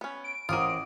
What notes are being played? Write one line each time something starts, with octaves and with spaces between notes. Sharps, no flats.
B3 C#4
D7
A1 F4 A#4 C5 F#5 D6 D#6 D#7